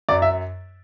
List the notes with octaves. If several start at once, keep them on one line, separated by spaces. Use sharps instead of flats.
F#2 D5
E5